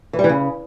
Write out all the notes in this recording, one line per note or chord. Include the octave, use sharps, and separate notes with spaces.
E3
G3
E3
C#3